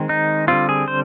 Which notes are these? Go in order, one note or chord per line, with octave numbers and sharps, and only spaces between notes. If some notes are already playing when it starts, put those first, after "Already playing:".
Already playing: D#3 G#3 C4
D#4
D3 G3 C4 F4
G#4
C5